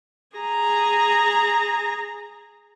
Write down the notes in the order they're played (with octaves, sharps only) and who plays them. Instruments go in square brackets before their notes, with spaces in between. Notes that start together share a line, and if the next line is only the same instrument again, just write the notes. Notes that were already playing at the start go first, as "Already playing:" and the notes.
[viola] G#4 A#5